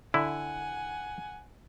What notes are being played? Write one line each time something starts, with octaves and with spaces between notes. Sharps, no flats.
D3 E4 F#5 G#5